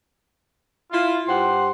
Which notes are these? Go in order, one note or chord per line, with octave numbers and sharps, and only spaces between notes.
E4 F4
G2 G4 C5 F#5 C6